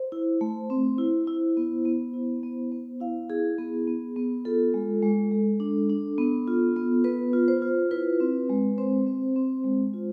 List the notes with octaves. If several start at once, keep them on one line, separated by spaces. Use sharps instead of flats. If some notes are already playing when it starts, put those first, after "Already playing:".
Already playing: C5
E4
A3
C4
E4
E4
B3
B3
E4
B3
B3 C5
E4 F5
E4 G#4
B3 G#4
B3
B3
F4 A4
G#3
G#3
G#3
D4
D4
B3
F4
B3
B3 B4
F4
C5
F4
E4 B4
C4
G#3
C4 C5
C4
C4
G#3
F4